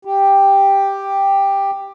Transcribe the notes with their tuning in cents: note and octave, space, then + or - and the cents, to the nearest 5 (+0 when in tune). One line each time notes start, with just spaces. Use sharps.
G4 +5